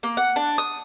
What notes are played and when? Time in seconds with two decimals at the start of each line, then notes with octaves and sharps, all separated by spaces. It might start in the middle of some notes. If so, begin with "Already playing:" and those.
0.03 A#3
0.17 F#5
0.36 D4
0.58 D#6